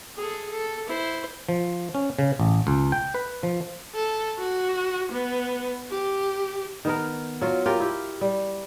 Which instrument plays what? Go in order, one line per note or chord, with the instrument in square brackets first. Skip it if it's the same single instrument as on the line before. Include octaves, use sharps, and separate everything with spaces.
[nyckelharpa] G#4 A4
A4
E4 C5
[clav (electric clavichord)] F3
C#4
C#3
A1
C#2
G5
B4
F3
[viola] A4
F#4
B3
G4
[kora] D#3 B3 A#4
F#3 F4
F4 G4 A#4
E4 G4
G3